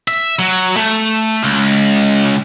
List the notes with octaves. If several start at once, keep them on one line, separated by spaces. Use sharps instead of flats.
E5
F#3
A3
C#2